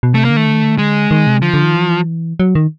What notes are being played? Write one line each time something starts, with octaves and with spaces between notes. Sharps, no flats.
B2
C3 A3
A#3
D3
D#3 A3
D3
D#3
D3
D#3
D3 G#3
D#3
C3
D3 F3
D3
D#3
E3
F#3
D#3